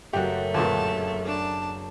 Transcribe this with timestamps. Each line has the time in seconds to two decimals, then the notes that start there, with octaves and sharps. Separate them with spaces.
0.13 F#1 F#2 A3 F#4 G4
0.54 D2 G2 A#2 F#4 G#4 A5
1.24 D4 A5